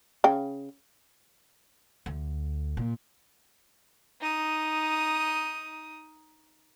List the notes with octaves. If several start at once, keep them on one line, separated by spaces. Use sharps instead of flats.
C#3 G5
D2
A#2
D#4 D#6